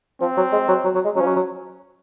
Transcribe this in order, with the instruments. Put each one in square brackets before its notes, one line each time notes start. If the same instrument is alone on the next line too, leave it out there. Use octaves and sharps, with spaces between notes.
[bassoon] F3 [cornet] C4
[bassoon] F#3
G#3
F#3
F#3
F#3
G#3
[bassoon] F#3 [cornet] C#4
[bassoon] F3
F#3
F#3